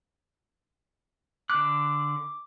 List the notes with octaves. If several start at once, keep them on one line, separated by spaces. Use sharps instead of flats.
D3 D6 F#6